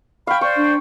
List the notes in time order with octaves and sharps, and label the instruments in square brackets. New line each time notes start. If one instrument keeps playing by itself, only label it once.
[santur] F5 G5 [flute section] B5 C#6 F6
[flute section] C5 D5 C6 [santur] C#6
[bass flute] D4